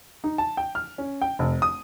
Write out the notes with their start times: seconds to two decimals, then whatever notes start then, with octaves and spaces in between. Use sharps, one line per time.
0.24 D#4
0.38 A5
0.57 G5
0.75 F6
0.98 C#4
1.22 G5
1.39 F1
1.62 D#6